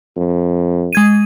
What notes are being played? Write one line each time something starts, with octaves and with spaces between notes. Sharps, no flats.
F2
G#3 G#6 D#7